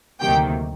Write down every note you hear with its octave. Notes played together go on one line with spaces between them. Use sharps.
D2 C3 D#3 F#3 A#3 G4 G5